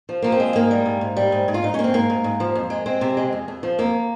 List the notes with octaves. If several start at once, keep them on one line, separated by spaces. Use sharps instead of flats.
F3
F3 A#3
C4
G#3
G#2 A#3
G3
G#2
G#2
G3
G#2
G#2
F4
G#2 D#4
C#4
A#3
C4
G#2 A#3
G#2
G#2
F3
F2
G#3
G#3 C4
C3
G#3
F2
F2
F3
F2 A#3